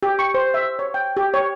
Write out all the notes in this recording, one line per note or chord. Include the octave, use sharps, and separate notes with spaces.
G4
C#6
C5
E5
C#5
G5
G4
C#5